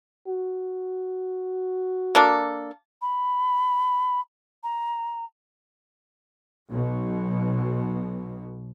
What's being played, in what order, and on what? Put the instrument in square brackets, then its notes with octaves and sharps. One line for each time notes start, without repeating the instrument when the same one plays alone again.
[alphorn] F#4
[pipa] A#3 D4 A4
[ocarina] B5
A#5
[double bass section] B1 B2